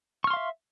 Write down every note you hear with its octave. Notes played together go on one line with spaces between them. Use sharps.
E5 F5 C6 C#6 F6